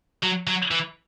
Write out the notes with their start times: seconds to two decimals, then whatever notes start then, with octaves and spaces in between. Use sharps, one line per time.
0.23 F#3
0.47 F#3
0.71 E3